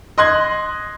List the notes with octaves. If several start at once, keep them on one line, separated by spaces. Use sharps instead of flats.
D#5 C6 F#6 G#6